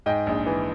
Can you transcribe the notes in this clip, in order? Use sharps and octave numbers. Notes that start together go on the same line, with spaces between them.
G#2 D#5 G5
A#1
E3